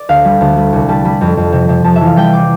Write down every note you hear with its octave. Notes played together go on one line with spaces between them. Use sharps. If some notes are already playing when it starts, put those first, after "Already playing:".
Already playing: D5
D2 F5
G3
D2
G3
C2
G3 A5
G3 B5
F2
F2
C3
C3
F2 A5
E5
E3
F5
G3 G5
D6